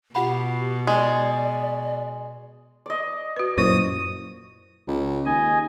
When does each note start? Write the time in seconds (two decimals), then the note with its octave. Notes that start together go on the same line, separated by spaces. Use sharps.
0.15 B2 F4 G4 F#5 B5
0.87 G#3 D5
2.86 D5 D#5
3.37 F#4 B4
3.58 F#2 A#2 E4 C5 C#6 D#6
4.88 C#2
5.25 D#2 D#5 G#5